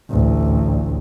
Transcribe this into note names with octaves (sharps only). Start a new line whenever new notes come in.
A1 D2